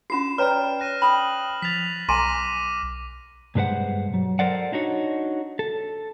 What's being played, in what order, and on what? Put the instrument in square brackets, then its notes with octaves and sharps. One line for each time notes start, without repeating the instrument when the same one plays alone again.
[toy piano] C#4 F4 F#4 [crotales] C7 E7
[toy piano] B4 C#5 A#5 [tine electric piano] D5 G5 B5 [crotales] F6
[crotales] F#6 A#6 D#7
[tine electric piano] G5 D#6 [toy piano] B5 [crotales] F#7
[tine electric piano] F3 A6 [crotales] B6 F7
[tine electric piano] B1 [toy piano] G#5 A#5 C6 [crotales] D6 A#6 D#7
[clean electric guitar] B1 G2 G#3 B4 C5 F#5
F#3
A4 A#4 C5 D5 F#5
D4 D#4 F#4 C#5
A4